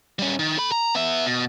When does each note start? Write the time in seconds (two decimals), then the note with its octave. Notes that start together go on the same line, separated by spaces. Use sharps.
0.19 G3 C#4
0.39 D#3
0.58 A4 B5
0.72 A#5
0.95 B3 E5
1.26 B2